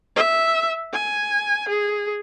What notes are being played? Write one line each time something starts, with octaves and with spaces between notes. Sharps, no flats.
E5
G#5
G#4